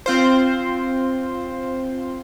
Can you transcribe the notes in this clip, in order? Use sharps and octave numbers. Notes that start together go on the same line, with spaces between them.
C4 F4 C5